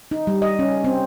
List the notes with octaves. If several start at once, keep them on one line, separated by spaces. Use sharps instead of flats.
D#4
G3
D#5
C#4
C4